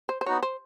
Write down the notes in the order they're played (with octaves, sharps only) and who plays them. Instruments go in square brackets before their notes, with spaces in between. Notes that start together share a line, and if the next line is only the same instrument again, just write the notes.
[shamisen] C5
C5
[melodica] B3 D#4 F#4 [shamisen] C#5
[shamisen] C5